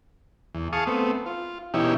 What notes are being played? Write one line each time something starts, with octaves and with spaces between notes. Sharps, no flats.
E2
G#4 F5 A5 C#6 D#6
A3 B3 C4
F4
B2 E3 C#4 D#4 E4 G4